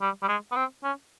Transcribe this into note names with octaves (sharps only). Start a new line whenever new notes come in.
G3
G3
G#3
B3
C4
C#4